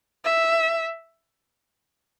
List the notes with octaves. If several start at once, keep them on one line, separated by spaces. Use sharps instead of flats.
E5